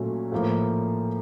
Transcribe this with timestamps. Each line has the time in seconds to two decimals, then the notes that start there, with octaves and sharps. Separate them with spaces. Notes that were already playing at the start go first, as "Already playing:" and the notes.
Already playing: A#2 F#3 A3 C#4
0.32 A2 F3 A#3